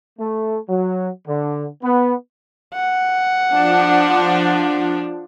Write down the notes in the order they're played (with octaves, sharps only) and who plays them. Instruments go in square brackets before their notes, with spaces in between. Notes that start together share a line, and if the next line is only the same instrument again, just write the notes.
[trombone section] A3
F#3
D3
B3
[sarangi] F#5
[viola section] F3 D4